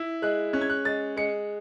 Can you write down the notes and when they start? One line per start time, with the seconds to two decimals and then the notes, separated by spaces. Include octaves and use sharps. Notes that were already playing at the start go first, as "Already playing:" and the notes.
Already playing: E4
0.22 G#3 F#6
0.53 C#4 F#6
0.61 G#6
0.70 F#6
0.85 G#3 A6
1.17 G#3 C#7